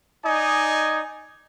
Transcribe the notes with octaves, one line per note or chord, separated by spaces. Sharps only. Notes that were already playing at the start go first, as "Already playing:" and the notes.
D#4 D5 D#5 G#5